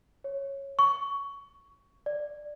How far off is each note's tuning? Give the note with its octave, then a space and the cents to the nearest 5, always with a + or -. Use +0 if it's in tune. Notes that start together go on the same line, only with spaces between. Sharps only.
C#5 -10
C#6 +15
D5 +10